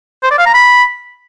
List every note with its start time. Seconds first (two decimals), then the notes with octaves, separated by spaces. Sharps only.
0.23 C5
0.31 D5
0.39 F5
0.46 A#5
0.54 B5